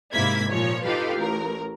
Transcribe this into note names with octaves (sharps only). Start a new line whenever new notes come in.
G#2 C3 A#3 E4 G#6 B6
A#2 F3 C#5
D#4 F4 G4 A4 B4 F5
A1 A#4